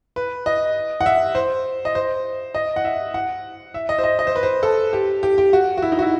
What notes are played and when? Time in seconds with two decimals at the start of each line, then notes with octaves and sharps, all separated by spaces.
0.16 B4
0.46 D#5
1.01 F#5
1.06 E5
1.35 C5
1.85 D#5
1.95 C5
2.54 D#5
2.76 F#5
2.85 E5
3.14 F#5
3.74 E5
3.89 D#5
3.98 C5
4.04 D#5
4.19 D#5
4.27 C5
4.36 B4
4.43 C5
4.63 A4
4.93 G4
5.23 G4
5.38 G4
5.53 F#4
5.77 F#4
5.82 E4
5.92 D#4
5.99 F#4
6.02 E4